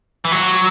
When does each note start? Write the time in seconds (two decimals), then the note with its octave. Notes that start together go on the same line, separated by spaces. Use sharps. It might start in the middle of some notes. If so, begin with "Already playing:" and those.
0.25 E3
0.32 F#3